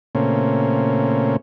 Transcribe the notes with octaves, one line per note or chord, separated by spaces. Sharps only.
A#2 C#3 A3 A#3 C4 C#4